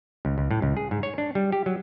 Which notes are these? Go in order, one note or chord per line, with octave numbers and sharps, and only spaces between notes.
C#2
C#2
A2
C#2
G#4
G#2
C#5
D4
G3
G4
F#3